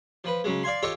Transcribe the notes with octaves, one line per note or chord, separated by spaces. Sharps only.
F3 B4
C#3 F#3 G#3
D5 F5 G#5 C6
F4 G4 A4 C#5 D#5